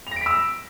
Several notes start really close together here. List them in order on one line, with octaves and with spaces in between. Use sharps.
F7 A#6 D7 B6 E6